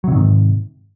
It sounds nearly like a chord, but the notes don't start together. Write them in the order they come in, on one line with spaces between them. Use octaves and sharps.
F#3 C3 D#3 G#2